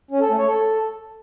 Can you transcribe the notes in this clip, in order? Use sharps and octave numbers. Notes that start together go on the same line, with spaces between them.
C#4
A4
A3
C#5
A4